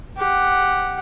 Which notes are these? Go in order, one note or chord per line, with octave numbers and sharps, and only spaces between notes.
G4 F#5